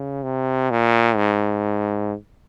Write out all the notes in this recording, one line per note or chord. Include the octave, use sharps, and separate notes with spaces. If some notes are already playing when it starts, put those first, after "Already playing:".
Already playing: C#3
C3
A#2
G#2